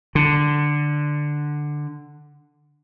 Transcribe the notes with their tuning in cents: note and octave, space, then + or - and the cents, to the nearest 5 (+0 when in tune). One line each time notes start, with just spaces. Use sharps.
D3 +5